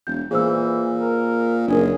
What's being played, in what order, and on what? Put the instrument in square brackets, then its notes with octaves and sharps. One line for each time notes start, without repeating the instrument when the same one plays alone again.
[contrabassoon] E1 [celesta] G6
[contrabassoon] A#2 [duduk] E3 [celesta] G#4 C5 E6
[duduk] A#4
[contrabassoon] F#1 [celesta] D4 A#4 [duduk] G#4